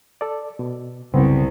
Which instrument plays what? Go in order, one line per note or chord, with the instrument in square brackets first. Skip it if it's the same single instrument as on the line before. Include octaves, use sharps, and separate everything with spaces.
[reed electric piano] A4 D5
B2
[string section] C2 [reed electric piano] F#2 B3 C4 [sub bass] C#3